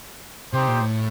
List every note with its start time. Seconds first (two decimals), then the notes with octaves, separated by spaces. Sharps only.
0.53 C3 D#4 G4 C5
0.68 A#2
0.81 A2